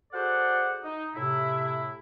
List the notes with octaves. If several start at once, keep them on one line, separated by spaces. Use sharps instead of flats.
F#4 G#4 A4 C5 D5 F#5
D#4
A2 C3 E4